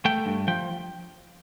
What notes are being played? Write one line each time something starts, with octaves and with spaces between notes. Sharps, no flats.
A3 G5
G2
F3 G5